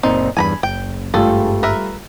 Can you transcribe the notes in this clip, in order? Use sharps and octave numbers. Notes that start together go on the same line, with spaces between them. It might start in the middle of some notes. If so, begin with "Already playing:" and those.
F#1 A#2 C4 D#4
E2 G2 G#5 A#5 B5
F#1 G5
G#1 G2 G3 A3 F4 G#4 A4
A#4 B4 E5